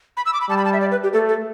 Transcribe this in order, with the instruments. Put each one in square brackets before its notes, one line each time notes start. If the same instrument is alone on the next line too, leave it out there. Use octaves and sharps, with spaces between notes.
[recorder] B5
E6
D6
B5
[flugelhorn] G3 [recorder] A5
[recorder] B5
A5
E5
D5
B4
G4
[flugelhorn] A3 [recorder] A4
[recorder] A4